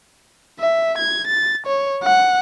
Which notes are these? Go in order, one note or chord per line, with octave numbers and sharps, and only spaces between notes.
E5
G#6
A6
C#5
F#5